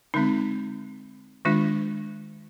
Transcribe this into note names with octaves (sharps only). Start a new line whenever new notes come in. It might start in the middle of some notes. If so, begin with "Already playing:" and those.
D3 G#3 C4 D#4
D#3 G#3 D4 F4